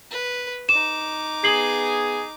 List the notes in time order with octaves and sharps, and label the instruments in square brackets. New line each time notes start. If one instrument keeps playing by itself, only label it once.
[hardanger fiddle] B4
[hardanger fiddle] D#4 D6 [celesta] E7
[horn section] B3 G#4 [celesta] C7 F#7